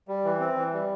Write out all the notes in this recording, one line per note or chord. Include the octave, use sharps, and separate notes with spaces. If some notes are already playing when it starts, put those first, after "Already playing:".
G3
E3
C4
E3
G3